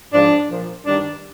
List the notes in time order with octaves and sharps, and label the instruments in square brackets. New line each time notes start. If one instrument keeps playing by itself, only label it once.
[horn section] G#2 F3 D4
A#2 F3
G2 D#3 D4